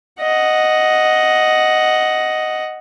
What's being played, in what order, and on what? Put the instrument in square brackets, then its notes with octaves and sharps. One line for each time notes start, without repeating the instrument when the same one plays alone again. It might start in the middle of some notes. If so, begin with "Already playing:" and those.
[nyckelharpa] D#5 F#5